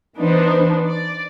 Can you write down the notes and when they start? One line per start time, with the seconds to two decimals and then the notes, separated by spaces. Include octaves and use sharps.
0.17 E3 B3 D4 D#4 B4 C5
0.86 D5